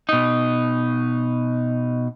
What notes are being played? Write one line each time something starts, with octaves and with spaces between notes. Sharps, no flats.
B2 D#4